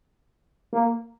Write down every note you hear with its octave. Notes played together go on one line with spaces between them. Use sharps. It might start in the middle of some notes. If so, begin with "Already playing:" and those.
A#3